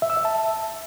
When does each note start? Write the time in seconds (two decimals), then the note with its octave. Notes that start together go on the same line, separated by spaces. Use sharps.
0.02 E5
0.10 E6
0.17 E5
0.25 A5